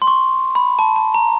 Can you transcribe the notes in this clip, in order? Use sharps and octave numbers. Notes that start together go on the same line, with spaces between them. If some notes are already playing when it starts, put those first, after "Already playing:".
C6
C#6
B5
A5
A5
A#5